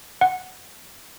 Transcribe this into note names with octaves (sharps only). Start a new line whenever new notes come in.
F#5